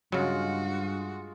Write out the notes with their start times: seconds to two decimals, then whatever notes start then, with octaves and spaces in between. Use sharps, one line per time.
0.12 G2 C#3 F#3 G#3 F4 F#4